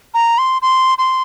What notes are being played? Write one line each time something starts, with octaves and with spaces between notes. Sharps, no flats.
A#5
C6
C6
C6